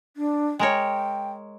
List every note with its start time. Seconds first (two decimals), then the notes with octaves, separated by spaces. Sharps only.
0.17 D4
0.59 G#3 A#4 C#5 G5